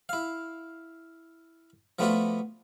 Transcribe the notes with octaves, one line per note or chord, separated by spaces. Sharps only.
E4 F5
F3 A3 B3 D4 F4 F#4